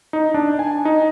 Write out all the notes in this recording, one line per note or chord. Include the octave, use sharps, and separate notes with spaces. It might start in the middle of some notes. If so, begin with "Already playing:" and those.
D#4
D4
G#5
D#4